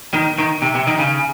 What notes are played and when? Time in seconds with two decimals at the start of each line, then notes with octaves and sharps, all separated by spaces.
0.14 D#3
0.38 D#3
0.62 C3
0.75 C3
0.87 D#3
0.99 C#3